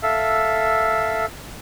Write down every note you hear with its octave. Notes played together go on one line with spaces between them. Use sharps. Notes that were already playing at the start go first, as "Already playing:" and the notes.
A4 E5 F5